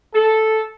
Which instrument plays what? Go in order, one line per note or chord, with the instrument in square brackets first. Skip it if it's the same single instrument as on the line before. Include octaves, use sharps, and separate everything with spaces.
[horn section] A4